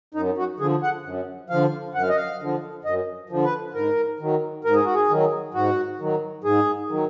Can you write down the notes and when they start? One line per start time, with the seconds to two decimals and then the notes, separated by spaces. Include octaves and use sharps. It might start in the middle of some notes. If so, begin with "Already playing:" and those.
0.14 F#2 D#4
0.38 F#4
0.60 D3 F3 G#4
0.83 F#5
1.05 F#2
1.50 D3 F3 F5
1.95 F#2 F#5
2.02 F5
2.09 D#5
2.16 F5
2.40 D3 F3
2.85 F#2 D#5
3.30 D3 F3
3.45 B4
3.74 G#2 A#4
4.20 D#3 F#3
4.64 G#2 A#4
4.74 G#4
4.85 F#4
4.94 G#4
5.09 D#3 F#3
5.54 G#2 F#4
6.00 D#3 F#3
6.44 G#2 G#4
6.89 D#3 F#3